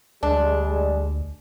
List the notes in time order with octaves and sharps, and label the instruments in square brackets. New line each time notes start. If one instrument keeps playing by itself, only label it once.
[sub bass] D2 [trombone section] G3 G#3 [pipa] D4